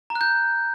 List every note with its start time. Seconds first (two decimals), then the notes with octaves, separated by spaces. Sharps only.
0.10 A#5
0.15 F#6
0.21 G6